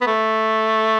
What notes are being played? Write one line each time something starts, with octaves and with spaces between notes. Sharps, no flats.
B3
A3